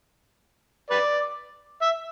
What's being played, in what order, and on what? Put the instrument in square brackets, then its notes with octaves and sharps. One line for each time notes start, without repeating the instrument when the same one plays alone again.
[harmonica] B4 D5
E5